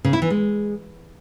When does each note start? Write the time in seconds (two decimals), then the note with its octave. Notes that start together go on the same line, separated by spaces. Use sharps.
0.04 C#3
0.13 E4
0.22 E3
0.30 G#3